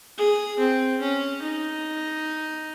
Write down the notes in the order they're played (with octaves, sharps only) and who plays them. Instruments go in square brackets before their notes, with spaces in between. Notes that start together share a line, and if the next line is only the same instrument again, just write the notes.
[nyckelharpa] G#4
C4
C#4
D#4